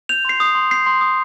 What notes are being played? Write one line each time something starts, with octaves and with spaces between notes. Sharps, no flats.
G6 F7
C6 C7
D#6
C6
G6 C7
C6
D#6